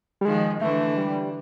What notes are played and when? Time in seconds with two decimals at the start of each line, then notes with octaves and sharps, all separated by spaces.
0.21 G3
0.25 D#3 F3 G#3
0.61 D3 E3 A3
0.97 G3